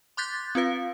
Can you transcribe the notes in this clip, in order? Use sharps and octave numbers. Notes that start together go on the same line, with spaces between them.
C6 D6 F#6 G6 A6 B6
C4 F4 B4 F5